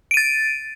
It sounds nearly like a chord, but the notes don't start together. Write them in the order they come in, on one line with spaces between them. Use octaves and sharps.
D7 D#7 A6